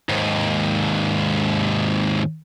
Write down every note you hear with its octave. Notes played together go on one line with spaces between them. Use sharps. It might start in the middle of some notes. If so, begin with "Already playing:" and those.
D#2 G#2